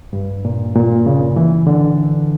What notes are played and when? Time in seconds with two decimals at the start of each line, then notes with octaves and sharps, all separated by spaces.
0.13 G2
0.45 A#2
0.75 A#2
1.06 C#3
1.36 E3
1.67 D3